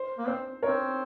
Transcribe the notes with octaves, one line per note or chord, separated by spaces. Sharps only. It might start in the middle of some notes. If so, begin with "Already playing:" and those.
Already playing: C5
A#3
C4 C5
C4 A#4 C#5